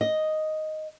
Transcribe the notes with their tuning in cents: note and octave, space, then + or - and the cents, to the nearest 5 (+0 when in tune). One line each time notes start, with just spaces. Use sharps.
D#5 +0